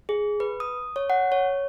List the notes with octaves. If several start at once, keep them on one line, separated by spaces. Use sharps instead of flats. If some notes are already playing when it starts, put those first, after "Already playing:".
G#4
B4
D#6
C#5
F#5
C#5